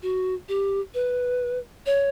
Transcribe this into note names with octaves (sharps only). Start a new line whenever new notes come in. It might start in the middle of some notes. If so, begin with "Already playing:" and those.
F#4
G4
B4
C#5